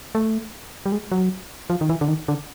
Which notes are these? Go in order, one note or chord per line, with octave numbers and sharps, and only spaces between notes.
A3
G3
G#3
F#3
F3
D#3
E3
D3
D#3
D3